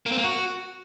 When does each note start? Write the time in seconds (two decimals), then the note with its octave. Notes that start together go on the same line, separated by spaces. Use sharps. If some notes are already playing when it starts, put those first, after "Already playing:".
0.06 A#3
0.12 C4
0.18 A#3
0.24 F#4